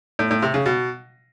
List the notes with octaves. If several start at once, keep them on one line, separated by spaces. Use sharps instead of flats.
A2
A2
C3
C#3
B2